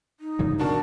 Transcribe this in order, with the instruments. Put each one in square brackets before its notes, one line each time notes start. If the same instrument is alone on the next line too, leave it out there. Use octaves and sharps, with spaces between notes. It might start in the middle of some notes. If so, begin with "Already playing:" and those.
[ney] D#4
[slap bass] G2 C#3 E3
[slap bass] B2 C4 [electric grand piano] D4 F#4 A5 [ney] A#4